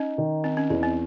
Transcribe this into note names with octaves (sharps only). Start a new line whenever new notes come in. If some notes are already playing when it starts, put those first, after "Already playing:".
Already playing: C#4 D#4
D#3
C4 D#4
C#4
E2 C#4
C4